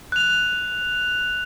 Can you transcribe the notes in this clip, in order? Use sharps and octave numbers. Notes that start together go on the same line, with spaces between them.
F#6 F7